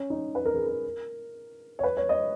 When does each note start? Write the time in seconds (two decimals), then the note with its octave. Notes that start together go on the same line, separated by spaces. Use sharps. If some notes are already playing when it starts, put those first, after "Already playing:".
Already playing: C#4
0.10 D#4
0.35 B4
0.45 A#4
0.55 G#4
0.67 A#4
1.79 C#5
1.83 B4
1.97 C#5
2.09 D#5